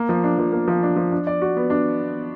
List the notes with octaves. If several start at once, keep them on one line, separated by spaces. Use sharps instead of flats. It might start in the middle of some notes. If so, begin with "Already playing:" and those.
Already playing: A#3
F3
D4
F3
A#3
F3
D4
F3
D4
D5
F#4
B3
D4